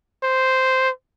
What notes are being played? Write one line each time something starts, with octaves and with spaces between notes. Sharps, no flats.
C5